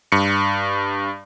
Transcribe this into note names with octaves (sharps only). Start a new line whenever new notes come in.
G2 C#7